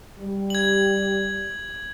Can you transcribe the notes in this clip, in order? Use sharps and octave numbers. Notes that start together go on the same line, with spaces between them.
G3
G#6 F#7